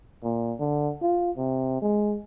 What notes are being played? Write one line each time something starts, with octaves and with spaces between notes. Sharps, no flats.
A#2
D3
F4
C3
G#3